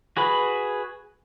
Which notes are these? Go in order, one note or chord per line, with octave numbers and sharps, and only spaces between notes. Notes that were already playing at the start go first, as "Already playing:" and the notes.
F#4 G#4 B4 B5